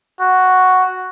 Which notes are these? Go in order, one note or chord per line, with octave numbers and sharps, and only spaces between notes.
F#4